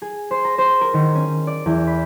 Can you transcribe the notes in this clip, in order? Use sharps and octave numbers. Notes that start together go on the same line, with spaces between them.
G#4
C5
A#5
C5
A#4
D#3
C#4
D5
E2
B5